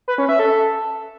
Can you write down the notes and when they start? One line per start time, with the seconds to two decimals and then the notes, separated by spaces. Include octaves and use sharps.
0.08 B4
0.18 C#4
0.29 E5
0.39 A4